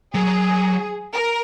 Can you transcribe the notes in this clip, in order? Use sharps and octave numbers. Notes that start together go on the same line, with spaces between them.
F#3 G#4
A#4